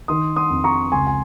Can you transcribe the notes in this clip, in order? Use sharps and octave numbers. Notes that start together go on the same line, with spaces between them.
D#3 C6 D#6
C6 D#6
F2
A#5 C#6
C#2 G#5 C6
G#5